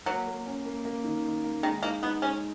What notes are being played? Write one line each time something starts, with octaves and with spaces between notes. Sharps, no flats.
F#3 A#3
A#3
C#4
A#3
A#3
D#3
D#3
A#3
D#3 G#3
A#3 D#4
B3 D#4
G#3 C#4